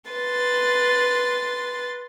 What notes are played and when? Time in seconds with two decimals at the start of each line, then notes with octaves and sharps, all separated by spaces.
0.10 B4 C6 A6